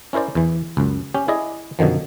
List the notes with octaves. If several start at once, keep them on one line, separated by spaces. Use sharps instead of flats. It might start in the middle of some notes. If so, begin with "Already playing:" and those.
C#4 E4 A#4 C5 D5
E2 E3
C#2 F#2
C#4 G4
E4 G#4 D5 D#5
F#2 B2 D3 D#3 F3